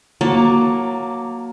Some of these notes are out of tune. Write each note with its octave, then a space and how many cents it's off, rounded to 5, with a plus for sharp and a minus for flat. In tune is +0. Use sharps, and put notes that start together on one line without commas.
F#3 +0 A#3 +10 A5 +15